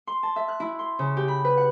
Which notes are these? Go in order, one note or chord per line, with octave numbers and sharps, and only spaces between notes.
C6
A5
E5
F#6
E4
C6
C#3
G4
B5
B4
F#5